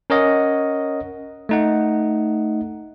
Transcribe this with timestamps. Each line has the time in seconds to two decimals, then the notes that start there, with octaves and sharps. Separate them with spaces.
0.10 C#4 A#4 C#5 D#5 F#5
1.49 A3 D#4 F#5